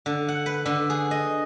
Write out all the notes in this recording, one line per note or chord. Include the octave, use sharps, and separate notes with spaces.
D3
F#5
B4
D3
G#4
D#5